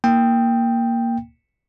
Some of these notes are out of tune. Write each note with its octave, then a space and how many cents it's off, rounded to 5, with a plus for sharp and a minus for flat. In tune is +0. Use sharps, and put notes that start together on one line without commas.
A#3 +0 G5 +5